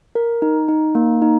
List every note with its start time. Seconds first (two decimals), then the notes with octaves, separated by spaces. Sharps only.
0.15 A#4
0.42 D#4
0.68 D#4
0.95 A#3
1.22 D#4